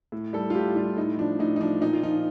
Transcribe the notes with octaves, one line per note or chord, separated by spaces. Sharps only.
A2
G3 A4
F4
A2 G4
G3 F4
A2 D#4
F3 D4
A2 D#4
D#4
F3 D4
A#2 D#4
F4
F3 D#4